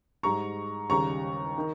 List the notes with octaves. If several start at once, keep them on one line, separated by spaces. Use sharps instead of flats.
G#2 G3 A#5 C#6
D#2 C#3 G3 A#5 C#6
D#3